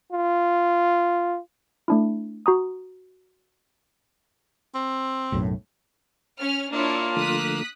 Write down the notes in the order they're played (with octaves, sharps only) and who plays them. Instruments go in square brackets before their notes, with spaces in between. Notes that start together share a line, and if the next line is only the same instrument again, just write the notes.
[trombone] F4
[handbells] A3 D4 E4
F#4 A#5 D#6
[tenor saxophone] C4
[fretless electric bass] B1 F#2 A2
[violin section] C#4 F6
[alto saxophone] A#3 [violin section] D4 E4 C#5 [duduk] F4 [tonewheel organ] D5 E6
[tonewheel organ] D3 F3 A3 [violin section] D#6 F#6 B6